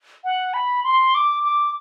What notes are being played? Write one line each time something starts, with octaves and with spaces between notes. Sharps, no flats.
F#5
B5
C6
D6
D6